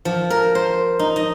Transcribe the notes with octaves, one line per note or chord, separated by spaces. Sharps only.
F3
A#4
C5
D#4
D#5